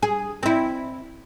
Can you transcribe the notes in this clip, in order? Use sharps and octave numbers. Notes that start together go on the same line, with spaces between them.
G#4
C4 E4